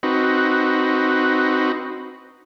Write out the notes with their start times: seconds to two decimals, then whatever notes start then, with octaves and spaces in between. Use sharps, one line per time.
0.03 C4 D#4 F#4 B4